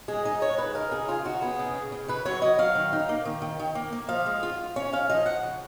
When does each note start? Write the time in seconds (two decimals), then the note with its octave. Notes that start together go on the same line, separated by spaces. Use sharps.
0.08 G#3 G#4
0.25 D#4 D#5
0.42 G#3 C#5
0.58 C#3 B4
0.75 D#4 A#4
0.91 C#3 G#4
1.08 C#3 F4
1.25 D#4 F#4
1.42 B3 G#4
1.59 C#3
1.75 C#3
1.92 C#3
2.08 C#3 B4
2.25 F#3 C#5
2.42 F#3 D#5
2.59 F#3 F5
2.75 D#3
2.93 D#4
3.09 A#3
3.25 D#3
3.42 D#3
3.59 D#3
3.75 A#3
3.93 A#3
4.08 F3 F5
4.26 G#3
4.43 F4
4.59 F4
4.76 C#4 C#5
4.93 C#4 F5
5.10 F3 D#5
5.25 F3 F#5
5.43 C#3